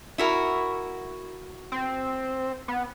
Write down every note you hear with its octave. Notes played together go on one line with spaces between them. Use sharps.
E4 F#4 A#4
C4
B3